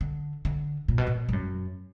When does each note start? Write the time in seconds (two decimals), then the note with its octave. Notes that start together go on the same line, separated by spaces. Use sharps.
0.01 D3
0.45 D3
0.88 A#2
0.98 B2
1.07 A#2
1.29 G#2
1.33 F#2